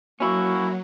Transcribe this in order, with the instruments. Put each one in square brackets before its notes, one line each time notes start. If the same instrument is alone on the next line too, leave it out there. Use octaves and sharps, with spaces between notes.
[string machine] F#3 [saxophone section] A#3 F#4 [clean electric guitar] C#4 E4